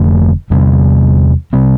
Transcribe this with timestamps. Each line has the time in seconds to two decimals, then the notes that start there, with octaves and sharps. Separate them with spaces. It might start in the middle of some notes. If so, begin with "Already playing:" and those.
Already playing: F1 F2 D3 A3
0.50 E2 C3 G3 C4
1.53 C3 G3 C4